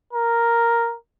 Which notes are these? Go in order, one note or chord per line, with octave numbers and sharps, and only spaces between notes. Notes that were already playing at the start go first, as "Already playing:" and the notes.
A#4